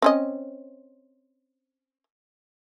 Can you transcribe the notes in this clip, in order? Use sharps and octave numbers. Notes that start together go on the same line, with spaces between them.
C4 C#4 D#5